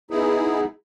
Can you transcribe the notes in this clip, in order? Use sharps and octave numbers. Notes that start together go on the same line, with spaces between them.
B3 D#4 E4 G#4